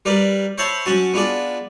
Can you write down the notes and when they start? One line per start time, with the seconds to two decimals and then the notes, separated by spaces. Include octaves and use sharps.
0.05 G3 A#4 B4 D5
0.58 C5 C#5 E5 A5 B5 C6
0.86 F#3 C#4 F#4 A5
1.13 B3 D4 F4 G#4 D5